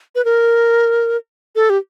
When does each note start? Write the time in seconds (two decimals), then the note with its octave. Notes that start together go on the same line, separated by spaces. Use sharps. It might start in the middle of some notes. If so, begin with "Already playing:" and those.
0.15 B4
0.25 A#4
1.56 A4
1.70 G4